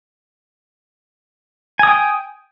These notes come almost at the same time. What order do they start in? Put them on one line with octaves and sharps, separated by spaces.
G#5 D#6 G5